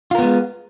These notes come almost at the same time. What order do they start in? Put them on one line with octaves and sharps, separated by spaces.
F4 A#4 B3 G#3